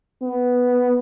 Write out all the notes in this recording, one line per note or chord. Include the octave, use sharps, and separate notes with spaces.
B3